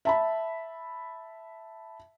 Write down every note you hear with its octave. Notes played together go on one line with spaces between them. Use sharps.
E5 A5 B5